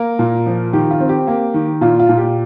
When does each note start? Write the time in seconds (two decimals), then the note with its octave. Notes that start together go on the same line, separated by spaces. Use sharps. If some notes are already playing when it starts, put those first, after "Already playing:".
Already playing: A#3 A#4
0.19 A#2
0.46 F3
0.73 D#3 G4
0.91 F4
1.00 C4
1.09 G4
1.27 A#3
1.54 D#3
1.81 A#2 F4
1.99 F4
2.09 A#2
2.17 G4